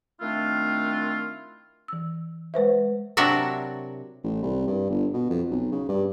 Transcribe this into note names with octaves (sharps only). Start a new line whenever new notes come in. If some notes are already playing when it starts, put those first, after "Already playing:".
D#3 A3 C4 D4 E4 F4
E3 E6
G#3 B4 C5 E5
C3 F#3 D4 F#4 A#4 E5
A1
C2
G2
G1
B2
F2
B1
C#3
G2